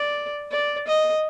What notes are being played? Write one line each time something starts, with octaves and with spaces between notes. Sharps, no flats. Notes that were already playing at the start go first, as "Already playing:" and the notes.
Already playing: D5
D5
D#5